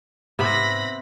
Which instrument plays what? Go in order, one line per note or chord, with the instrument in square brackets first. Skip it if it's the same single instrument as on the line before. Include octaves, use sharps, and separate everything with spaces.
[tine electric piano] G#2 [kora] C3 B3 C4 [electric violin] B5 A#6